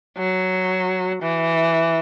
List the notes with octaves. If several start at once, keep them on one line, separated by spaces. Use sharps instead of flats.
F#3
E3